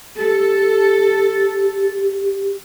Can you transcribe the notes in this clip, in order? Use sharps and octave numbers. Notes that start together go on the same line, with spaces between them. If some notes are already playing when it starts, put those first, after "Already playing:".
G4 A4